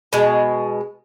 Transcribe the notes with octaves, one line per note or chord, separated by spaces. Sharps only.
B2 G#3